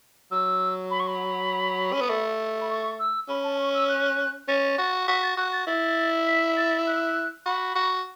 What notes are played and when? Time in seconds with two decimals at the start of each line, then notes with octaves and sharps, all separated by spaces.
0.31 F#3 E6
0.91 B5
1.00 C#6
1.08 B5
1.93 C#4
2.01 B3
2.10 A3
2.61 B5
2.70 C#6
2.99 E6
3.29 C#4 B5
3.44 A5
3.59 C#6
3.74 E6
3.89 F#6
4.48 C#4 A6
4.78 F#4
5.08 F#4 B6
5.23 A6
5.37 F#4 F#6
5.52 A6
5.67 E4 A6
6.27 B6
6.57 A6
6.87 F#6
7.46 F#4 B5
7.75 F#4